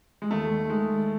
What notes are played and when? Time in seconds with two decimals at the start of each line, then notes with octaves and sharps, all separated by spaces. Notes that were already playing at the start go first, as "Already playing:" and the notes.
0.22 G#3
0.31 D#2 A3
0.70 D#3 G#3